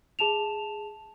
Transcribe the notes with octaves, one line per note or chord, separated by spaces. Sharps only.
G#4 A5 E7 F7